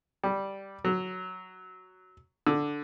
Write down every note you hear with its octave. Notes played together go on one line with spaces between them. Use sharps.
G3
F#3
D3